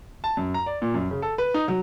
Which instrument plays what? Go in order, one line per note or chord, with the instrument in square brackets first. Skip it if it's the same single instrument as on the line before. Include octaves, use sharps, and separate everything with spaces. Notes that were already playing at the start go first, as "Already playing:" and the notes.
[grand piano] A5
F#2
A#5
D5
A#2
F#2
C#3
A4
B4
D#4
F#3